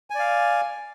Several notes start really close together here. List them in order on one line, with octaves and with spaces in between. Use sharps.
G#5 D5 F5